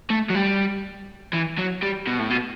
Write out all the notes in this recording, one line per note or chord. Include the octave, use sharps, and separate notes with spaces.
A3
F#3
G3
E3
F#3
G3
B2
A2
B2